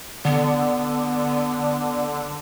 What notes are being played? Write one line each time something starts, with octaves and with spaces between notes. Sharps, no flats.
D3 B3